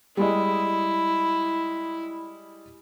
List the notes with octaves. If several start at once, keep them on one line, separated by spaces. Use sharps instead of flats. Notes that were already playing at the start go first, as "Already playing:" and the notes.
G3 G#3 E4 D#5